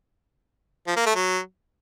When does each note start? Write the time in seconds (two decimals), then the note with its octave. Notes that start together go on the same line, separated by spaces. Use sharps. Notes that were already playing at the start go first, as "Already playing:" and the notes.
0.87 F3
0.97 A#3
1.06 A3
1.15 F#3